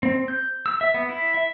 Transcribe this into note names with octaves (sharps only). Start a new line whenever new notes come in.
C4
G6
E6
E5
B3
E4
E5